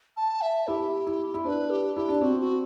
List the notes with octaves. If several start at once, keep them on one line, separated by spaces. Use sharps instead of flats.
A5
E5
E4 G4
E4
E4
D4 B4 C5
G4
E4 G4
D4
C4 F#4
F#4